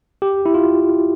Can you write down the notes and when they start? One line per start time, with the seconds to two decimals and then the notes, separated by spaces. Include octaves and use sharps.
0.22 G4
0.46 E4
0.54 F4